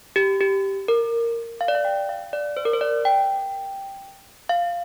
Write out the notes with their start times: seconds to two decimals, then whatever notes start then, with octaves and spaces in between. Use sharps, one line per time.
0.16 G4
0.41 G4
0.88 A#4
1.61 F5
1.68 D5
1.75 F5
1.85 G5
2.09 F5
2.33 D5
2.57 C5
2.65 A#4
2.73 C5
2.81 D5
3.05 G5
4.49 F5